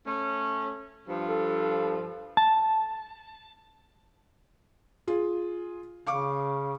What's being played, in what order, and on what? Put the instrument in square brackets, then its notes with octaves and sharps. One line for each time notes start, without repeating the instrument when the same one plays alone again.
[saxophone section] A3 C#4
G2 F3
[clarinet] A4
[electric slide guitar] A5
[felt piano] F4 G#4
[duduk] C#3 [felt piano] F5 C#6 D6